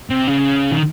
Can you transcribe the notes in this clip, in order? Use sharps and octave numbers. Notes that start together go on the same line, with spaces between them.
C3
C#3
D#3